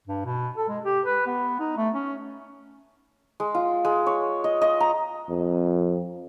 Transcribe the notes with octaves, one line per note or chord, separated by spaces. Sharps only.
G2
B2
A4
G#3
G4
B4
B3
D#4
A3
C#4
G#3
F4
G#3
C#5
D#5
D#5
A#5
F2